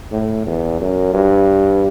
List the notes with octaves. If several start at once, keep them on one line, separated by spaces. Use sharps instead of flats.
A2
E2
F#2
G2